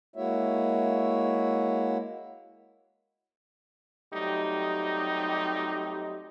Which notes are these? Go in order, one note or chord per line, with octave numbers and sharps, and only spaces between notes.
G#3 A#3 E4 F#4 C#5 E5
F#3 G3 A3 C4 D#4 G4